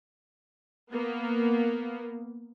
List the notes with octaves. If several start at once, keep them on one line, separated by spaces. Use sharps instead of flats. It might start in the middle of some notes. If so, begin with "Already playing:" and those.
A#3 B3